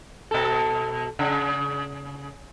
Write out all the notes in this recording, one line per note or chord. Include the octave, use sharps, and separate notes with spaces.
B2 A4
C#3